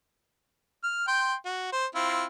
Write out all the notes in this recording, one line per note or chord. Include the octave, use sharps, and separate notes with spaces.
F6
G5 C6
F#4
C5
C4 E4 F4